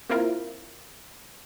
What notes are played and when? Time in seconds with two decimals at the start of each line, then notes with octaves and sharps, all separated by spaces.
0.09 A#3 C4 E4 F4 A#4